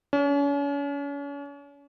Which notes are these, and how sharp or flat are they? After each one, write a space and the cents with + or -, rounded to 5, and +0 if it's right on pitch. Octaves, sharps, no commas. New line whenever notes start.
C#4 +40